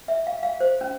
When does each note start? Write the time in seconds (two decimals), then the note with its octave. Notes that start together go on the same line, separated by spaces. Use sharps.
0.08 E5
0.27 F5
0.43 F5
0.60 C5
0.81 C#4